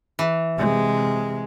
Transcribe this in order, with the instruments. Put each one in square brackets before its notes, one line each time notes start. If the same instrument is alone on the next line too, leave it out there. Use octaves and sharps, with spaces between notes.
[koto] E3
[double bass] C3 G#3